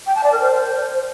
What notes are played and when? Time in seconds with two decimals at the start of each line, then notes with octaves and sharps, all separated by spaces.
0.07 G5
0.15 A5
0.24 D5
0.32 A#4
0.40 C5